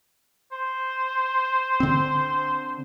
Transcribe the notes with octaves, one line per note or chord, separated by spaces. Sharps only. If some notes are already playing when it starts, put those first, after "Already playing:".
C5
D3 C4